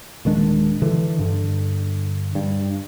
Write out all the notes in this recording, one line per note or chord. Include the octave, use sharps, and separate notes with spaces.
D#1 D#3 G#3 D4
D3 E3
G2 D3
G2